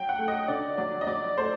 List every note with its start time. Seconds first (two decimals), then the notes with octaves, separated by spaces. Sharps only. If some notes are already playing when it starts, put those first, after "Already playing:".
Already playing: F#3 G5
0.09 F#5
0.19 A3
0.28 D#5
0.48 D3 D5
0.77 F#3 D5
1.01 D#5
1.07 F#3 D5
1.38 A3 C5